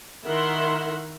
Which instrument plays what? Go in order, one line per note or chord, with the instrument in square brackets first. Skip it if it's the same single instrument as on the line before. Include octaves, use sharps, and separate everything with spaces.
[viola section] D#3 E4 A#4 E5 F#5 C6